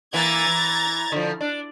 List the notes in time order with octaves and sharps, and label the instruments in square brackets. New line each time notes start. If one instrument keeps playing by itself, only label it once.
[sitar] E3 A#3 [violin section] A#5 G#6 A6
[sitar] E3
D3 F3
D4